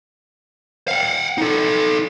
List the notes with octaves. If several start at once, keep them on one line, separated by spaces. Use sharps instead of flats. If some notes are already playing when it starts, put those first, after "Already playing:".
F5 F#5
D#4 A4